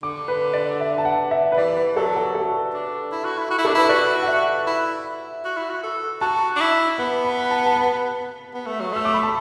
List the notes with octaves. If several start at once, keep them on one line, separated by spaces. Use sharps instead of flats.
D3 D6
B4
D5
E5
A5
F#5
E5
B4
E3 D5
B4
F#3 A4
F#4
A4
D4
E4
F#4
E4
F#4
E4
D4 A4
E4 B4
F#4 D5
F#5
E5
E4
F#4
E4
F#4
A4
F#4 A5
D4
E4
B3 B5
B5
A5
A5
B5
B3
A3
F#3
A3 E6
D6
B5
A5